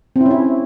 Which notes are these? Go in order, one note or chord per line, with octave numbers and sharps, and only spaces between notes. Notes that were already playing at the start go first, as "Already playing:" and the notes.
C4
E4
C#4
E4